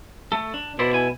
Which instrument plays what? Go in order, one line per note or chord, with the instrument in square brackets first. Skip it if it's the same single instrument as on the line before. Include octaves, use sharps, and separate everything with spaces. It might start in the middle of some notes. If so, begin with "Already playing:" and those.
[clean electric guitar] A3 A4
D4
[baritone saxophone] B2 [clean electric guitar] E4 C5 D5
[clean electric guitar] E4 G#5